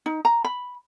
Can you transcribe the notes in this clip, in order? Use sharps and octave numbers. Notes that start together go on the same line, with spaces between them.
D#4
A#5
B5